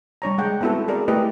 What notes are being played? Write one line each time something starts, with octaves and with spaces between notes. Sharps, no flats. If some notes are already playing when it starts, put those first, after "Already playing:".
G3 D4 C#5 A#5
G#3 F#5 G5
B3 C4 E4 F#4 A4
G#4 A#4 D5
A3 E4 G4 B4 D#5